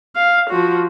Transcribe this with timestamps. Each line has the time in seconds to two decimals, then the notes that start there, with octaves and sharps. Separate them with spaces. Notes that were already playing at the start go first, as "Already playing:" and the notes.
0.16 F5
0.50 F3 F#4